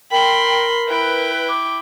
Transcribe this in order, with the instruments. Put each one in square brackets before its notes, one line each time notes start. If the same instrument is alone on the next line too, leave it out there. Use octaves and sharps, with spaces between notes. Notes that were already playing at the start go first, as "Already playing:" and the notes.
[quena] A#4 [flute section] G5 [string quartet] B5 C6
[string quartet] E4 G5 [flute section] B4
[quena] D6